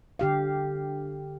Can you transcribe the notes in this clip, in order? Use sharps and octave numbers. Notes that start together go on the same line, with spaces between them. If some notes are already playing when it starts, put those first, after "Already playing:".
D3 G4 F5